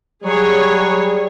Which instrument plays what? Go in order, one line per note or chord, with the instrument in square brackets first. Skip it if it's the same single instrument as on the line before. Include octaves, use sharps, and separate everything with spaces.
[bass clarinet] F#3 [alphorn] G3 [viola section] G#4 C#5